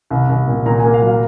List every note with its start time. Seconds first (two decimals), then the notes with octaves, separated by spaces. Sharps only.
0.11 C2
0.29 C2
0.48 A#2
0.66 A#2 A#5
0.79 A#3 G#5
0.94 F5
1.02 F#3
1.08 F5